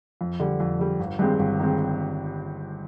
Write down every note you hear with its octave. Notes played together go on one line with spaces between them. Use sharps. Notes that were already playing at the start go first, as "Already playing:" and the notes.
F2
D3 G3
F2
D3 G3
G1
G2 D#3 G#3 C4
G1
D#3 G#3 C4